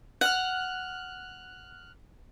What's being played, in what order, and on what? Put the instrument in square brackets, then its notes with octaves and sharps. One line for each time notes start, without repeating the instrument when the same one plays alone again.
[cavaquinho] F#5 [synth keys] F6 F#6